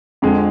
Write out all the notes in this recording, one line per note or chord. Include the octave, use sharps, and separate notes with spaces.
F2 D3 G#3